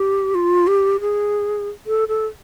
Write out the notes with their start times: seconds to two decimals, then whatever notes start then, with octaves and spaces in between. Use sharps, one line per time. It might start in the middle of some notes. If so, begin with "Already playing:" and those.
Already playing: G4
0.35 F4
0.67 G4
1.00 G#4
1.87 A4
2.08 A4